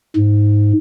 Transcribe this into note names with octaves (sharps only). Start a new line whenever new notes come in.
G#2